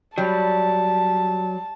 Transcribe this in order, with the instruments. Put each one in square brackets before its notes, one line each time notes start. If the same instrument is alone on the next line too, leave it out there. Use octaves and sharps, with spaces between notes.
[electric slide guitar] F#3 [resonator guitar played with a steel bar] G3 [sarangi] A5